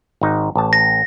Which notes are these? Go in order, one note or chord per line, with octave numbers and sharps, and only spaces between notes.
G#1 D#4
A1 A5
A#6